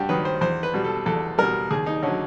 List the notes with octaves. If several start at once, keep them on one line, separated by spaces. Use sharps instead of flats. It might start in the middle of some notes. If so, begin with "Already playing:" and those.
Already playing: G2 F#4 G4
D#3 F#3 B4
C5
E2 C5
B4
B2 G3
A4
E2 A4
B2 G3 A#4
D#2 G#4
D#4
D3 F#3 C#4